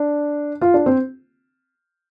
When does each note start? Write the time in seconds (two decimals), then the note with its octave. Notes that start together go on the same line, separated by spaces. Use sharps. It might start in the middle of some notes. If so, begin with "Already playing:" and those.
Already playing: D4
0.61 F4
0.74 D4
0.86 C4